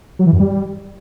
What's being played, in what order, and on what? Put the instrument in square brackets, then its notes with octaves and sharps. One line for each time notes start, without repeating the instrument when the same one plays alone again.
[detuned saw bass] F#3
E3
F#2
G3